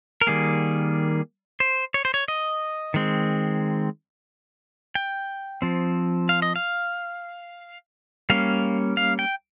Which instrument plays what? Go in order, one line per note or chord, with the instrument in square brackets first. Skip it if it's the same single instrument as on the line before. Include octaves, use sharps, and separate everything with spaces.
[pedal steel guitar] A#4
D#3 G3 A#3 G#4
C5
C#5
C5
C#5
D#5
D#3 G#3 C4
G5
F3 C4
F5
D#5
F5
G3 A#3 C#4 F5
F5
G5